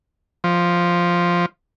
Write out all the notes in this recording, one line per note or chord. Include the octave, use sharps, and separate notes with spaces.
F3